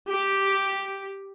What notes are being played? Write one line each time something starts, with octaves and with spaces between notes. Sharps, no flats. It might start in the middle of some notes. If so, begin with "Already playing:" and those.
G4